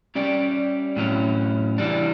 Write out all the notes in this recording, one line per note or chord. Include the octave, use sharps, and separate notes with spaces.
G3 C#4 G4 D5
A2 F#3 C#4
E3 G3 D4